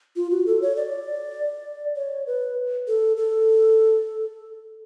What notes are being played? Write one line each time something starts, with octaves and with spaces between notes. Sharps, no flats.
F4
F#4
A4
C#5
D5
C#5
B4
A4
A4